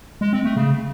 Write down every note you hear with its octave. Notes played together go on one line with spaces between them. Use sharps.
G#3
C4
A3
C#3